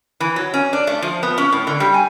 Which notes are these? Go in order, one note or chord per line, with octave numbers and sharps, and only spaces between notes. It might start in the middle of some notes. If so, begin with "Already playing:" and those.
E3
F#3
C#4
D4
A3
F3
B3
C#4
A2
D3
G3
G#5